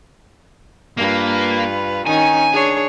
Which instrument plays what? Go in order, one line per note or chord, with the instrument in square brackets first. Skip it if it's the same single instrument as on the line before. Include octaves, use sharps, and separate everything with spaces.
[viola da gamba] G2 F4 B4 [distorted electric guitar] A#3
[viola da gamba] D#3 C#4 D#4 [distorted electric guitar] G#5
[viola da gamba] D4 G#4 C#5